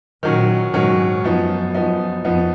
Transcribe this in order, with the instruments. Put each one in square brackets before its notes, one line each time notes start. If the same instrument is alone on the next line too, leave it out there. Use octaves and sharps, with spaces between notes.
[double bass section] A#2 [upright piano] D#3 F#3 C#4
[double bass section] G#2 [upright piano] D#3 F#3 C#4
[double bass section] F#2 [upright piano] F3 B3 D#4
[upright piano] F3 B3 D#4
[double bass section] F2 [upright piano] F3 B3 D#4